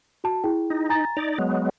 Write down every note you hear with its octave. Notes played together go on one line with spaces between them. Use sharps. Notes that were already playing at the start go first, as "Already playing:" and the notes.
F#4 A5
E4 G#4 G5
D#4
G#5 A#5 A6
D#4 D5 F7
F#3 G#3 B3